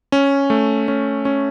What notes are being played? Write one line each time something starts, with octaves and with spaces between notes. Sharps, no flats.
C#4
A3
C#4
C#4